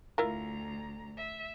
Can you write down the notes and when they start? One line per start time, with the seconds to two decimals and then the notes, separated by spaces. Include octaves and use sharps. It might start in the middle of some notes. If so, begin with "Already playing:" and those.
0.18 D2 E4 F4 A#4 A#5
1.17 E5